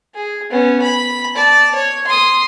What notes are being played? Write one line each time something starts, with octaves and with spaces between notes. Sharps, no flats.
G#4
B3 C#4
B5
D5 A5
C#5
C6 D#6